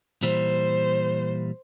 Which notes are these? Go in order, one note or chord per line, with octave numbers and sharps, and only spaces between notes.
A#2 E3 G3 C5